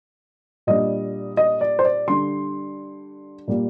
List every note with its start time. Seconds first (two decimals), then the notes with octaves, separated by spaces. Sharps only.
0.67 A#2 G3 D4 D#5
1.37 D#5
1.61 D5
1.79 C5
1.85 D5
2.07 D3 G3 D4 C6
3.48 A#2 G3 A#3